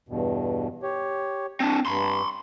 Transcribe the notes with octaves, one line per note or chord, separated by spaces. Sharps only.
E2 G2 B2
G4 C#5
C4 D4
G2 B5 C6